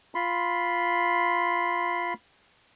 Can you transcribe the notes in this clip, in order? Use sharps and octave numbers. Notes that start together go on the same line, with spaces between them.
F4 B5 C6